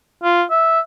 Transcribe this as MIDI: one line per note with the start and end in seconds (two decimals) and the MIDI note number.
0.24 0.43 65
0.51 0.80 76